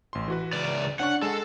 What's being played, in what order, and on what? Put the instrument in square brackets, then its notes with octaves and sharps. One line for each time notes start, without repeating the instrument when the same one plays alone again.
[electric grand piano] A1 C6
E3 F#4 B4
[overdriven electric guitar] C#2 D5
[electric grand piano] C#4 D4 C#6 [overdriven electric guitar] F#5
[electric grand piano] G#3 G#5 [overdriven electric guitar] A4